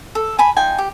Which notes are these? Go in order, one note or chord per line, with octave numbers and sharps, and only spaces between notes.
A4
G#5 A5 B5
D#4 F4 G5 G#5
G4